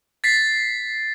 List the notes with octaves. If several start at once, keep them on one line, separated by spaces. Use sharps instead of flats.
A6 B6 C7